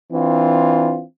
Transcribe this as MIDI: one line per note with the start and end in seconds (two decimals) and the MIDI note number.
0.13 1.03 52
0.13 1.03 60
0.13 1.03 62
0.13 1.03 65